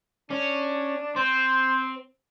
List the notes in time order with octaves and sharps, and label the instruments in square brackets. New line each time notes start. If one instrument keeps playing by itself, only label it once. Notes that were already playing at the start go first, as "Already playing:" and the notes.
[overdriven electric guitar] C#4 [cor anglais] D4
[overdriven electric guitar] C4 [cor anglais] C5